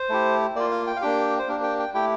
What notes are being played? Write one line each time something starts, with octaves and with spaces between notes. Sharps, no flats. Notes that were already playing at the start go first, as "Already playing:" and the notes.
Already playing: C5
A3 E4 G4
A#3 F4 D5
F5
G5
F5
A#3 D4 G4 G5
C5
A#3 D4 G4 A#4
G5
G5
A3 E4 G4 G5